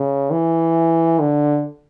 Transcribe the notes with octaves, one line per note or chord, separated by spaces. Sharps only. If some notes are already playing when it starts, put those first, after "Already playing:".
Already playing: C#3
E3
D3